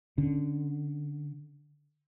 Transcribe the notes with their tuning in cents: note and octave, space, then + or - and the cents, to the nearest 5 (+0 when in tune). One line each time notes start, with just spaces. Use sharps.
D3 +0 C#4 +0